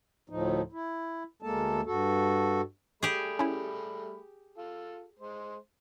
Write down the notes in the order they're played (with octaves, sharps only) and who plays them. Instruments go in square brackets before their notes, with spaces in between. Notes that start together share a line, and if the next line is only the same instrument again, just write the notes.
[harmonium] D2 A2 F3 D#4
E4
D2 G#3 A#3 A4 A5
G2 F#4 A4
[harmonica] G3 A3 B5 [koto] G4 G#4
[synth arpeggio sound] C#4 E4
[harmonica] F4 A4
G#3 C5